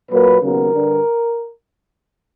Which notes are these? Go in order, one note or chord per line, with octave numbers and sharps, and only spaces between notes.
A#2 F#3 A#3 B4
D#2 C#3 F#3 B3 A#4
G2 D3 G3